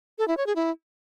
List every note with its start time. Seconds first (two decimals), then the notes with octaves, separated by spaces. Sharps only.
0.19 A4
0.28 E4
0.37 C#5
0.47 G#4
0.56 E4